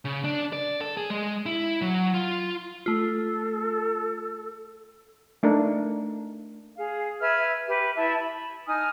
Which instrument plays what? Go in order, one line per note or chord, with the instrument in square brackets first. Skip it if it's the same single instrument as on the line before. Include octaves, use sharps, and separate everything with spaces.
[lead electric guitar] C#3
D4
D5
A4
G#4
G#3
E4
F#3
F4
[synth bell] A3 F4 [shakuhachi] A4
[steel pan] A3 D4 D#4 A#4
[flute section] G#4 F5
B4 E5 F6 G#6
G4 B4 E5
E4 E5 A5
B5
D#4 G#5 D#6 F6